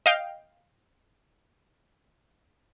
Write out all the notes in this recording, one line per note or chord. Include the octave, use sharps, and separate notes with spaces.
D#5 F5 G5